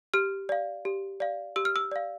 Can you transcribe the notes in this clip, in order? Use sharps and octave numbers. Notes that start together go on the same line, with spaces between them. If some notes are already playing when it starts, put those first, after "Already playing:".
G4 F6
D5 F5
G4
D5 F5
G4 E6
F6
E6
D5 F5